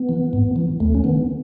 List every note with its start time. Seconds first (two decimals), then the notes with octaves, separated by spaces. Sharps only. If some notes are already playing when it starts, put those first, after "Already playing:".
Already playing: B3
0.09 E3
0.33 G#2
0.56 E3
0.80 D#2 A3
0.95 C#4
1.04 D#3 B3